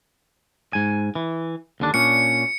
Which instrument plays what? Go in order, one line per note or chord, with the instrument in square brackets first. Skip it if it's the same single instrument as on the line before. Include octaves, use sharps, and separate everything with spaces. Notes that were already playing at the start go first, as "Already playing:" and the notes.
[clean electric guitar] G#2 G#5
E3
D#2 D3 D4
[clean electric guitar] A#2 C#4 D4 [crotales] C#7